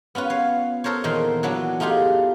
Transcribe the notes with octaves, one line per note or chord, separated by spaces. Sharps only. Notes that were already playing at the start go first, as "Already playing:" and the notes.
B3 C#4 F4 B4
C#5 F5
A4 A#4 C5 C#5
E2 A#2 D#3 D#4 C5
E3 F#3 B3 D4
A3 D#4 F4 G4 G#4